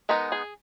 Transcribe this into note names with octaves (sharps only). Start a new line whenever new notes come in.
G#3 B3 D#4 A#4
G#4